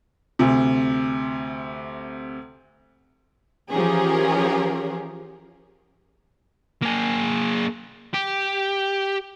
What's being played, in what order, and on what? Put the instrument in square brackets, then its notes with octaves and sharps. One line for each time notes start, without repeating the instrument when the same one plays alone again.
[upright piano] D2 C3
[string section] E3 F3 C#4 G4 G#4 A#4
[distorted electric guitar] A#3 G#4
G4